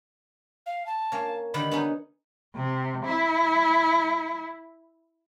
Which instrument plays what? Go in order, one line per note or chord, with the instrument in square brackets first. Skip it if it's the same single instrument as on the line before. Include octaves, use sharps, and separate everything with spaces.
[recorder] F5
A5
[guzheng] A#3 C#4
[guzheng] D3 D#3 G3 [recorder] B5
[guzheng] B3 C#4 D#4
[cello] C3
E4